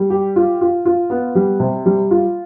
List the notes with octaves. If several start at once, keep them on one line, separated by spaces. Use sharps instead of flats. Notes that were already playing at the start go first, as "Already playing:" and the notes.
Already playing: G3
G4
F4
F4
F4
B3
G3
C3
G3
F4